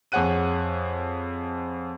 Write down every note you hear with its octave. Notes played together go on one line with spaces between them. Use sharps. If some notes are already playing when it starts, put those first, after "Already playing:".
F2 G#4 C#5 F#5 F#6 D#7